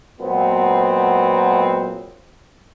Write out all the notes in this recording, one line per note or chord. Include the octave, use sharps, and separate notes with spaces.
A#2 F#3 G#3 B3 C4